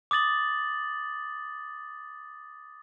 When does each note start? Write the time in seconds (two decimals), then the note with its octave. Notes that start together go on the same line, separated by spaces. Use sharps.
0.11 D6 D#6 A6 F#7